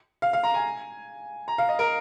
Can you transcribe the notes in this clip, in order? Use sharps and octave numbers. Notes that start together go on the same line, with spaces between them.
F5
F5
A#5
G#5
A#5
F5
D#5
A#4